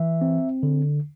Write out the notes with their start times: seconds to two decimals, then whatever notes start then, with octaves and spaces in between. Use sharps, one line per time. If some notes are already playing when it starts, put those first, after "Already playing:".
Already playing: E3 E5
0.21 C4
0.63 D3